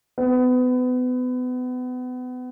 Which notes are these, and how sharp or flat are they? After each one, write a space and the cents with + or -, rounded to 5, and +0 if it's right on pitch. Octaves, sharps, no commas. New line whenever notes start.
B3 +30